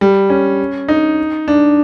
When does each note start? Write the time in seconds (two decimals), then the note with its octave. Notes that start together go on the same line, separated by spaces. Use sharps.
0.01 G3
0.30 C#4
0.88 D#4
1.48 D4